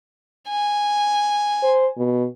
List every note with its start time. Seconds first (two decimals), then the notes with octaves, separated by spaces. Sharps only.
0.50 G#5
1.63 C5
1.97 B2